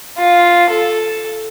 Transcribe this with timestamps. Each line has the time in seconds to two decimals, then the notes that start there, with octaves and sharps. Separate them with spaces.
0.18 F4
0.70 A4